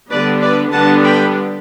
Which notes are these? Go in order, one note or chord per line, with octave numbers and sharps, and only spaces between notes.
D3 G3 B3 D4 B4 D5
B4 D5
D3 G3 B3 D4 F#5 A5
G5 B5